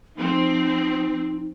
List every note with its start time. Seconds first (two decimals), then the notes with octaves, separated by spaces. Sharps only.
0.16 F3 C4 D#4